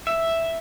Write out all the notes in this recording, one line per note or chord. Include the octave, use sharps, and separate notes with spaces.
E5